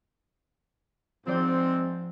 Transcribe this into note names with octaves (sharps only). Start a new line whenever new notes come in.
G#2 F3 C4 D5 G6